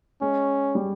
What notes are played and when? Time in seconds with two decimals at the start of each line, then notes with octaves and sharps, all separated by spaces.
0.21 G#3 C#4
0.75 G3